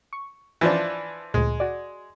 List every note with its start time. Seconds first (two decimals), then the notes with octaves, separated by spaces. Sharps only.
0.13 C#6
0.61 E3 F3 D4
1.34 D2 A#2 G#3
1.60 F#4 D5